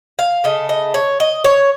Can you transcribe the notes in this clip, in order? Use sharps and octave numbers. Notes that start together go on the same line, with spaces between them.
F5
C#3 A3 D#5
D#5
C#5
D#5
C#5